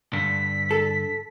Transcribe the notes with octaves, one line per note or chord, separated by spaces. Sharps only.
G2 D3 B6
A4